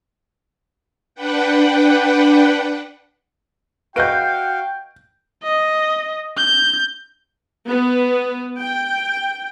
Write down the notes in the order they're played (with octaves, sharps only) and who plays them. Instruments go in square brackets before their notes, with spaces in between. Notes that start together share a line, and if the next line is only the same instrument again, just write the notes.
[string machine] D4 B4 F#5 G5
[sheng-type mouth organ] F#4 F5 [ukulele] B4 D#5 [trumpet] G5 [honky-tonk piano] G6 D7
[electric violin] D#5
G6
[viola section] B3
G5